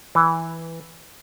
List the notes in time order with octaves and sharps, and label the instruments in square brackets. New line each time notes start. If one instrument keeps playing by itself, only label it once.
[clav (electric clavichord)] E3